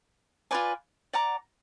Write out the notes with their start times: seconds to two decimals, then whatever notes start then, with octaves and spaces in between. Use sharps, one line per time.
0.51 F4 B4 D5 G#5
1.13 D5 F#5 A#5 D6